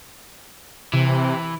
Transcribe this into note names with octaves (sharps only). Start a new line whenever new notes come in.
C3 E3